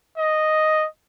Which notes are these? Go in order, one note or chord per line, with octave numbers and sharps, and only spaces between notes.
D#5